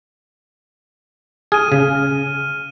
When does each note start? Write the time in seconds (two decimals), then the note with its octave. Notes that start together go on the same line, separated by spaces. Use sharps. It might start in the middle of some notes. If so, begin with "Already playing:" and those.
1.52 G#4 F6 D#7
1.72 C#3